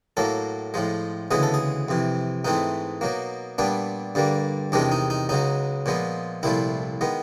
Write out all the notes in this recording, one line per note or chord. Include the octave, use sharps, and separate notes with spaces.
A2 F#3 A#3 A4
A2 F3 G#3
D2 C#3 E3 G#3 B3 G#4
A4
G#4
F2 C3 E3
G#2 E3 A3 C4 D#4
B2 F#3 A#3
A#2 G3 B3 D4
G2 D3 G3 A#3
E2 C3 D#3 G#3 D4
D#4
D#4
C#2 C#3 F#3 D#4
A#2 F3 G#3 B3
C2 A#2 F3 A3 E4
D#3 G#3 B3